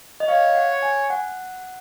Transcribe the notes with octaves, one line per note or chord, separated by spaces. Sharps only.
D#5
C#5 F5
F#5
G#5
F#5